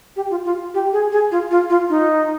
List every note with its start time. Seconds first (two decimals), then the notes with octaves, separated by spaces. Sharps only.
0.16 G4
0.30 F4
0.45 F4
0.74 G4
0.93 G#4
1.12 G#4
1.31 F4
1.51 F4
1.70 F4
1.90 D#4